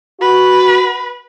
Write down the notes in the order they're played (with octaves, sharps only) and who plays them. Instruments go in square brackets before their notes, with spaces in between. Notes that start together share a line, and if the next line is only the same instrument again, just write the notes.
[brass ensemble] F#4 [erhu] B4